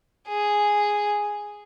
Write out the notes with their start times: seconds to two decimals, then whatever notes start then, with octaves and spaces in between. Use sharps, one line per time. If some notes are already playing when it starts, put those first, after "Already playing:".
0.29 G#4